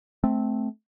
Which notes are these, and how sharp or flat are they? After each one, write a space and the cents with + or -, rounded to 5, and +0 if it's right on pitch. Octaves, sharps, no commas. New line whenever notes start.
A3 -15 C4 -5